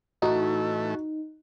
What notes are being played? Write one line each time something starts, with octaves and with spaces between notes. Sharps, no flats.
A2 E3 A3 D#4 F#4